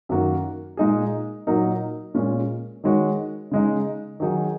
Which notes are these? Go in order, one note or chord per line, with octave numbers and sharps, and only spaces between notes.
F#2 D#3 A#3 F#4
A#2 G#3 D#4 G#4
A#2 F#3 D#4 A#4
A#2 G#3 C#4
D#3 G#3 F#4 C#5
C#3 G#3 D#4
D#3 F#3 D#4 G#4